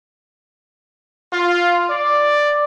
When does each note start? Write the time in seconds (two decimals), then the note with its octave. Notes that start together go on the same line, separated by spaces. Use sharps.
1.32 F4
1.90 D5